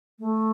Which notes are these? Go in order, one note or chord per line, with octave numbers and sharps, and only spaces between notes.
A3